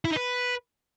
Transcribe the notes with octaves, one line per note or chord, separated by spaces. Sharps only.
E4
D#4
B4